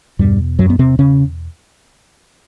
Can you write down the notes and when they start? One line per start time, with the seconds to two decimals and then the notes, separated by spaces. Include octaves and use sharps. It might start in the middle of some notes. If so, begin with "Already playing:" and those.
0.19 E2 G2 B2 G3
0.59 F#2 F#3
0.70 B3
0.79 C3 C4
0.99 C#3 C#4